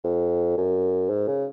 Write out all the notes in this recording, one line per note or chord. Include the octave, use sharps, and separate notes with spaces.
F2
F#2
G#2
C#3